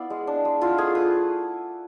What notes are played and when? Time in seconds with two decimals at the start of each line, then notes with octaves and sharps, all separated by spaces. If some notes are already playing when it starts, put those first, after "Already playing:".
Already playing: B3 E4 D5 F5
0.10 G#3
0.27 D4
0.45 G#3
0.61 E4 F4
0.78 A3 G#4
0.95 E4 B4